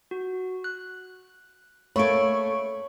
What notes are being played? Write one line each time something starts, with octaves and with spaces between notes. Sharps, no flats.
F#4
F#6
A3 A#3 A4 C#5 B5 C#6 D7